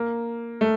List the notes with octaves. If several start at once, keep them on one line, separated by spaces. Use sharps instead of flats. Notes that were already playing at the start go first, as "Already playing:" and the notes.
Already playing: A#3
A3